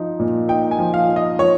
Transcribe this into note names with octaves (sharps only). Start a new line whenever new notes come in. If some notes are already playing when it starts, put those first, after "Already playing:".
Already playing: F3 D#4
A#2
D#4 G5
G#5
F3
F5
D#4
D#5
F3 C#5